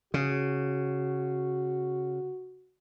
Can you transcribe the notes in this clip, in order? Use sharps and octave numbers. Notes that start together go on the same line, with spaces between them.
C#3 F#4